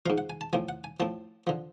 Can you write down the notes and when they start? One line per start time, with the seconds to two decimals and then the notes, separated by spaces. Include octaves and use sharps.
0.06 G#2 F3 F5
0.18 F#5
0.30 G#5
0.41 A5
0.53 A2 F3 G#5
0.69 F#5
0.84 G#5
1.00 A2 F3 A5
1.47 D3 F3